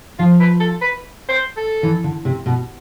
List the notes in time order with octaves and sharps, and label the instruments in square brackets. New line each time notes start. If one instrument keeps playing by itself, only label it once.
[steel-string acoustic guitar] F3 [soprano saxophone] F4
[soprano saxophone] B4
A4
B4
C5
A4
[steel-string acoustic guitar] E3
D3
C3
B2